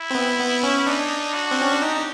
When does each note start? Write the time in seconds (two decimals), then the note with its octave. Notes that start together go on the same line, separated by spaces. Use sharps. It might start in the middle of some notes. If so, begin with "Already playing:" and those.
Already playing: E4
0.11 C4
0.15 B3
0.39 B3
0.63 C#4
0.86 D4 D#4
1.34 F#4
1.51 C4
1.61 C#4
1.72 D4
1.82 D#4 G4